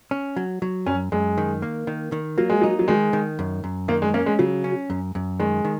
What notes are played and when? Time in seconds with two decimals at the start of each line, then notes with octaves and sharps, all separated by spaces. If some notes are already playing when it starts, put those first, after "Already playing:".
0.11 C#4
0.36 F#3
0.62 F#3
0.86 F#2 C#4
1.12 F#2 G#3
1.38 D#3
1.62 A#3
1.87 D#3
2.12 D#3
2.38 F#3 A#3
2.50 G#3
2.61 F#3 D#4
2.79 F#3
2.88 D#3 G#3
3.13 D#3
3.39 F#2
3.64 F#2
3.88 D#3 A#3
4.02 G#3
4.14 A#3 C#4
4.26 G#3
4.39 C#3 F#3
4.64 C#4
4.90 F#2
5.15 F#2
5.40 D#3 G#3
5.65 D#3